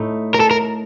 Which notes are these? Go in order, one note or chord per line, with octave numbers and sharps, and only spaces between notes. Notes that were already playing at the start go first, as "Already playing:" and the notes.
Already playing: A2 A3 D#4
A#4
A4
A#4